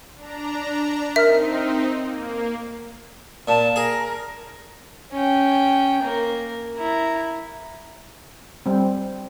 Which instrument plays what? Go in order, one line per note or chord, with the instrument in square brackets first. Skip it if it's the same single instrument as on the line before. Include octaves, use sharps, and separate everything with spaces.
[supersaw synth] D4 A#5
[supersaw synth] C4 D#4 [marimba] A#4 F6 [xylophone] E5
[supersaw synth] A#3
[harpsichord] A#2 [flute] A5
[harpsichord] G#4 [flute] A#4
[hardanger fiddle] C#4 G5
A#3 A#4
E4 A#5
[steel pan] G3 C4